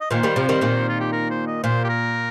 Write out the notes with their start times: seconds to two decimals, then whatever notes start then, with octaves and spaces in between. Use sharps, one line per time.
0.01 D#5
0.11 A#2 D#3 C5
0.23 D#3 G3
0.36 C3 F3
0.49 D#3 G3
0.61 A#2 D#3
0.89 F4
1.00 G4
1.12 A#4
1.30 C5
1.47 D#5
1.63 A#2 C5
1.84 G4
1.89 A#4